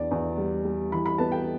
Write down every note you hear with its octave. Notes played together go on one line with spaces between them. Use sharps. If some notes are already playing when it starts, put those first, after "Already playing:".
Already playing: E2 D4 D5
E2
G3
G3
E3 B5
B5
B3 A5
G5